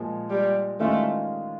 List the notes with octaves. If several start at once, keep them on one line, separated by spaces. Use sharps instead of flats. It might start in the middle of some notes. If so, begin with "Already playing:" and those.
Already playing: A#2 F3 G#3
G3
D#3 G#3 A3 C#4 F4